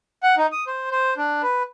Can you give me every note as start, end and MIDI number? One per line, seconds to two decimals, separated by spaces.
0.23 0.35 78
0.37 0.47 63
0.52 0.64 87
0.67 0.91 72
0.91 1.14 72
1.17 1.42 62
1.43 1.63 71